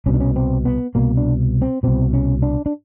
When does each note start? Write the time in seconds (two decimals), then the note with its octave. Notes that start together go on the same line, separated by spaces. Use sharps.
0.06 C2 C#4
0.09 B2
0.14 D4
0.20 C#4
0.36 C4
0.65 B3
0.95 C2 B2 A#3
1.17 D4
1.62 C4
1.83 C2 B2 C4
2.14 C#4
2.42 D4
2.66 D4